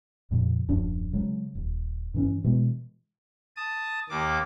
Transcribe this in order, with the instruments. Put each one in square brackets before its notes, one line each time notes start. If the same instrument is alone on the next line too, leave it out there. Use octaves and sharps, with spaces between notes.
[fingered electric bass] F2 A#2 C#3 F3
D#1 F#2 F3 D4
C#3 F#3 G#3
D#1
G2 E3 C#4
B2 E3 G#3
[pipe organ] A5 D#6
D#2 A#3 D6